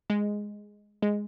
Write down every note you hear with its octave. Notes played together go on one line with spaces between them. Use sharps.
G#3
G#3